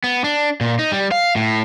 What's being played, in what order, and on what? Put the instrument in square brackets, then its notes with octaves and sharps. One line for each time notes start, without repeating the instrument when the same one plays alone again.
[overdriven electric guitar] B3
D4
A#2
D#4
G3
F5
A2